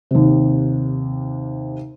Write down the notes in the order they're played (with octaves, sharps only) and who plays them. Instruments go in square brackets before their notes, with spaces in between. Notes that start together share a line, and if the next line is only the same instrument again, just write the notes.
[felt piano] D#2 C3